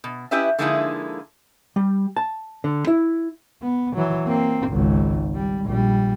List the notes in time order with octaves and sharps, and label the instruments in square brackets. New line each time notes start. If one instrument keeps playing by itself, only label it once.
[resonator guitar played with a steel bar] B2
C#4 E4 G4 B4 D#5 E5
D3 F3 G#3 A#3 D#4 E4
[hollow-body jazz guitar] G3
A5
D3
E4
[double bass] B3
E3 F#3
A#3 C4
G#1 C#2
G3
A#1 G3